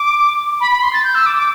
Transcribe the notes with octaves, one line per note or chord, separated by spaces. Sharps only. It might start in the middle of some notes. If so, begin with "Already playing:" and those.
Already playing: D6
B5
B5
C6
A6
G6
E6
D6
D6